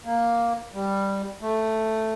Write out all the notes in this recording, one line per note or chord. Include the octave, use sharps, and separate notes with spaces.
A#3
G3
A3